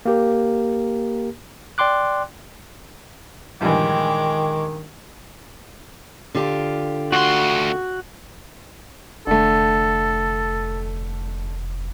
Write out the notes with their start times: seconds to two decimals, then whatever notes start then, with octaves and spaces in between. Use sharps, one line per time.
0.05 A#3 G4 A#4
1.78 D5 G5 C6 D6 F#6
3.61 A#1 G2 D#3 E3 G#3 G5 D6
6.35 D3 F4 G4
7.12 D2 F#4 C6
9.27 F1 D3 A3 A4